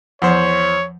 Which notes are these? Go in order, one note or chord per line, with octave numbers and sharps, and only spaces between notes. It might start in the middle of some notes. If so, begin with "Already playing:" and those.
E2 F3 C5 C#5 F#5